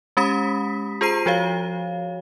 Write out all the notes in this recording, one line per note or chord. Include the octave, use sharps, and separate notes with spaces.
G#3 C#4 G4 B5 D#6 B6
F4 G#4 C5 A#5 C7 D#7
F3 F#4 C#5 F5